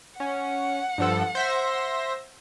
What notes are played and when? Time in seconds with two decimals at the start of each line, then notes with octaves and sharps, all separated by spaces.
0.20 C#4 F#5
0.98 G2 F3 A4
1.35 C5 E5 A#6